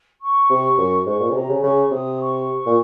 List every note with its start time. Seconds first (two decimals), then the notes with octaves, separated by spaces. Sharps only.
0.21 C#6
0.50 C3
0.78 F#2
1.06 G#2 C#6
1.20 A#2
1.30 C#3
1.35 C3 A#5
1.49 C#3
1.63 C#3 C#6
1.91 C3 D#6
2.20 C#6
2.66 A#2